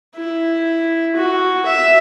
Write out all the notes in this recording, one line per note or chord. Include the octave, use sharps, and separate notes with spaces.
E4
F#4
E5